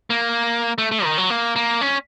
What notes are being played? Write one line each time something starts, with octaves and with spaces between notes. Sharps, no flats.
A#3
A3
A3
D#3
F#3
A#3
A#3
C#4